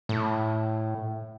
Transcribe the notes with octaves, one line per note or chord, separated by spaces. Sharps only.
A2